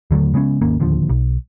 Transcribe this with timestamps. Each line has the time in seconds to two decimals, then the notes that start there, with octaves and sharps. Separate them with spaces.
0.11 D#2 D3 F#3 A3
0.34 C#3 G#3 B3 C#4
0.61 G#1 D#2 A#3 C#4
0.80 D1 D#2 D3 F3
1.10 B1